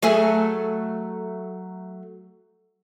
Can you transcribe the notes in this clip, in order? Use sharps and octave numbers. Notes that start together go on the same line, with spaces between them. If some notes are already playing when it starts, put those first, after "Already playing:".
F#3 A3 G#4